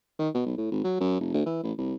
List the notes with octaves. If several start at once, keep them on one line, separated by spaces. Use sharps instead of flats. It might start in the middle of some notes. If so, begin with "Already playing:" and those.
D#3
B2
B1
A2
G#1
F#3
F#2
F1
D2
E3
A1
C2